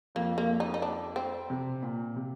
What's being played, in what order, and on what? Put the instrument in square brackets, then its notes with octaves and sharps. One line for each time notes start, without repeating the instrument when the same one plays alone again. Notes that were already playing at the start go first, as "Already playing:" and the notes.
[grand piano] F2 F3 [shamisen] A#3
[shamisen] A#3
D#4
D#4
D4
C4
[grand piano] C3
A#2
C3